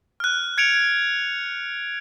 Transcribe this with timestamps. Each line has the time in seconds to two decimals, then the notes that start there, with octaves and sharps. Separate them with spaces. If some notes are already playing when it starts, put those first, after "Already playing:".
0.20 F6 F#6
0.58 G#6 C#7 D7 F7